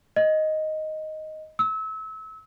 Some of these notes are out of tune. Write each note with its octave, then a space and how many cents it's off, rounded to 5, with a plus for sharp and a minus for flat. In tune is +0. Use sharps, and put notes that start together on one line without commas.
D#5 +5
E6 -30